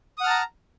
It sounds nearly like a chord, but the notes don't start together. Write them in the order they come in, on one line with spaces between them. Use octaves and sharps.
D#6 F#5 F6 A5 A#5